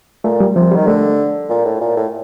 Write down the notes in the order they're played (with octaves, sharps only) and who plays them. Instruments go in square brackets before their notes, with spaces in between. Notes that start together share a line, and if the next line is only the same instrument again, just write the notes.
[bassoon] A#2 [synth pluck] A3
[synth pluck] G3
[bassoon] C3 [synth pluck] F3
[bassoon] D#3 [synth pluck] G3
[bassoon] D3 [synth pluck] A3
[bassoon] A#2
A2
A#2
A2